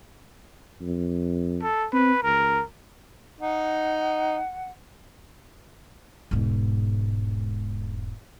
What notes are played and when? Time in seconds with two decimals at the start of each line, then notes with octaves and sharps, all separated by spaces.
0.82 F2
1.62 A4
1.93 C4 B4
2.23 C#2 A#4
3.40 D#4 F#5
6.31 E1 G#2